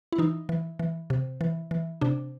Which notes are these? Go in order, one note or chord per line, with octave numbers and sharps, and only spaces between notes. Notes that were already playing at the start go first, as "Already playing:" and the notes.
E4
E3 D#4
E3
E3
C3
E3
E3
C3 D4